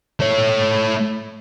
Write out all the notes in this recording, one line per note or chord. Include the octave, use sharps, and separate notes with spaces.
A3 C#5